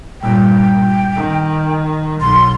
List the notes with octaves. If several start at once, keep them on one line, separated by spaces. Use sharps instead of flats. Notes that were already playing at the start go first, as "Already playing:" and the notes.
G2 A#2 G5
D#3
B1 C6